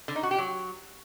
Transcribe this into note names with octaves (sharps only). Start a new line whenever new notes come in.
D3
D#4
F#4
G4
F#3